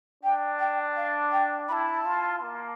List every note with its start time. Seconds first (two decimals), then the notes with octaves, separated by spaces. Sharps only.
0.23 D4 G5
0.59 G5
0.96 F5
1.32 G5
1.68 E4 A5 B5
2.05 F4
2.42 A#3